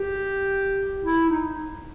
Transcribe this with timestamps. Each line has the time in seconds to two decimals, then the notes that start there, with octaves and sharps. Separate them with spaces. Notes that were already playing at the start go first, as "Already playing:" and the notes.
Already playing: G4
1.01 E4
1.29 D#4